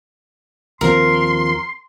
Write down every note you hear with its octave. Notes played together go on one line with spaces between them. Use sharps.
D#2 F3 C4 A#4 C6